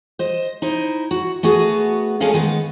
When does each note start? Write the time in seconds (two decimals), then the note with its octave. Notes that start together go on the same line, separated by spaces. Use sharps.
0.19 C5 D#5
0.62 D#4 E4 C5
1.11 F#4
1.43 A3 B3 F#4 G#4
2.20 G#3 A#3 C#4 G#4 A4 F5
2.33 D#3 G#3 B3